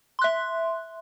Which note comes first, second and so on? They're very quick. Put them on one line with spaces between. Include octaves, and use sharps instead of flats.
C6 F#6 E5